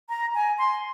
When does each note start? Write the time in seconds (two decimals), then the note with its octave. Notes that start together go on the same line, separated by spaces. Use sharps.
0.09 A#5
0.34 G#5
0.58 C6